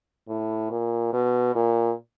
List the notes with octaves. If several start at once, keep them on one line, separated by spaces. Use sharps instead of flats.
A2
A#2
B2
A#2